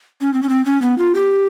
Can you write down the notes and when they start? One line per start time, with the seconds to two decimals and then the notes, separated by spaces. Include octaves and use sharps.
0.21 C#4
0.34 C4
0.43 C#4
0.49 C4
0.65 C#4
0.82 B3
0.98 F4
1.15 G4